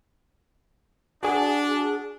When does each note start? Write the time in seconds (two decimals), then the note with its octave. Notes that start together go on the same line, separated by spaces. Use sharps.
1.23 D4 F#4 G#4